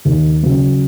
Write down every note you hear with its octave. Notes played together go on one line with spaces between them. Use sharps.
D#2
C#3 F#3